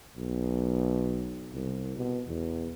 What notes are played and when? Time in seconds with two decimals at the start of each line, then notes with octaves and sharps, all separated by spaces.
0.17 B1
1.53 C2
1.97 B2
2.27 E2